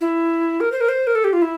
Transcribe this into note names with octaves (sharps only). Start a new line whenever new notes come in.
E4
A#4
C5
A#4
C5
A#4
A4
G4
F4
E4